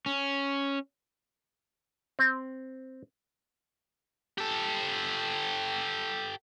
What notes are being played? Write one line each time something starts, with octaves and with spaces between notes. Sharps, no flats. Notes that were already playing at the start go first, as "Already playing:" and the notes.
C#4
C4
G4 A4